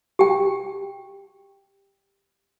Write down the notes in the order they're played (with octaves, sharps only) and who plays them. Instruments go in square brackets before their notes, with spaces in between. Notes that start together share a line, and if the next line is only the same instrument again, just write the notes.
[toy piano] G4 G5